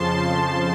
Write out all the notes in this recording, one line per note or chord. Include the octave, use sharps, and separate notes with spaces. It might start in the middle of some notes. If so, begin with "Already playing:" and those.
Already playing: F2 C#3 F3 A5 C6